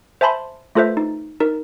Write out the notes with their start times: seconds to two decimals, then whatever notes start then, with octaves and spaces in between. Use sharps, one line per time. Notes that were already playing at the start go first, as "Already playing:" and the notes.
0.21 C5 E5 G#5 A5 B5 C6
0.75 A3 F4 A4 B4 C5 E5
0.97 D#4
1.40 D#4 A#4